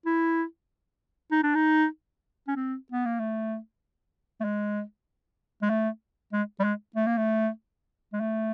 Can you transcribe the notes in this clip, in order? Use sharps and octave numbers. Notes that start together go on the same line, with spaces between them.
E4
D#4
D4
D#4
C#4
C4
B3
A#3
A3
A3
G#3
G#3
A3
G#3
G3
G#3
A3
A#3
A3
G#3
A3